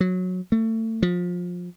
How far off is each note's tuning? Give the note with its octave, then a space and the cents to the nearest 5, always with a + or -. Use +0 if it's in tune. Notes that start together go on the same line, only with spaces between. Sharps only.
F#3 -15
A3 +30
F3 +25